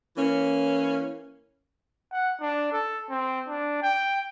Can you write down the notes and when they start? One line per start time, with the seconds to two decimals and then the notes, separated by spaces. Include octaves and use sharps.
0.17 E3 A#3 C#4
2.12 F#5
2.41 D4
2.72 A4
3.09 C4
3.48 D4
3.82 G5